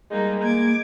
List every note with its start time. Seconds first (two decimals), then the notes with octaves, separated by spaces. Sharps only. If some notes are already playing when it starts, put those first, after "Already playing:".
0.10 G3 G#3 A#3 D#4
0.43 A#3 D6 G#6